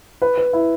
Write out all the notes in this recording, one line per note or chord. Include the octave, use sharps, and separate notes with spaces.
B4
B4
E4